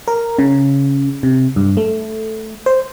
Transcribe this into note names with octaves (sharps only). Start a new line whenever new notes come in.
A#4
C#3
C3
G2
A3
C5